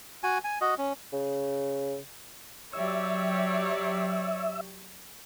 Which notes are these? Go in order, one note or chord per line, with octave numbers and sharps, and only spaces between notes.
F#4 G#5
G#5
F#4 D#5
C#4
C#3
F#3 G4 C#5 D5 E5